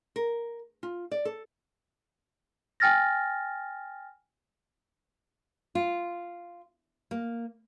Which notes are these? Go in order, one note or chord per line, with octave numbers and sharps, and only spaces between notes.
A#4
F4
D5
A4
G5 G#5 F6 A6 A#6
F4
A#3